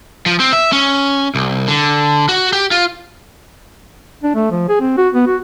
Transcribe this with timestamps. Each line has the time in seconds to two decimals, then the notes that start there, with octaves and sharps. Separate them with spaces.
0.26 F3
0.40 C4
0.53 E5
0.72 C#4
1.35 C2
1.68 D3
2.29 F#4
2.53 G4
2.71 F4
4.23 D4
4.35 A3
4.51 F3
4.69 G#4
4.81 C4
4.97 F#4
5.14 B3
5.27 F#4